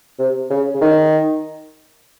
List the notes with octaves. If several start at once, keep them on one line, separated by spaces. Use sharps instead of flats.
C3
C#3
C#3
D#3